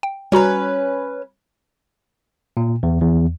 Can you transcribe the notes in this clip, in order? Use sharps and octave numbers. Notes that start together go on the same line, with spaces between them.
G5
G3 C#4 F#4 B4 A#5
A#2
E2
E2